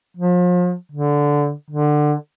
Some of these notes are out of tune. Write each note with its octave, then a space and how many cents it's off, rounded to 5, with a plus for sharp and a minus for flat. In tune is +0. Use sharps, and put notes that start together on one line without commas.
F3 +35
D3 -10
D3 +20